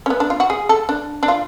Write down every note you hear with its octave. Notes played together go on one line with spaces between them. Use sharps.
C#4
B3
D4
F4
F#4
G#4
A4
D4
D4
F4